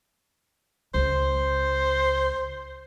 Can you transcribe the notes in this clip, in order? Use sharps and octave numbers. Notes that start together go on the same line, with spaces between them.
C#2 C5